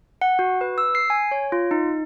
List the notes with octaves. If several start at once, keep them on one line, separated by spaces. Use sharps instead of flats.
F#5
F#4
B4
E6
C7
G#5
C#5
F4
D#4